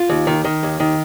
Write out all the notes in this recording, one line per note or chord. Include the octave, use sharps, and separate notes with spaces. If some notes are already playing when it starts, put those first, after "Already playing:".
Already playing: F4
D#2
D#3
D#3
D#2
D#3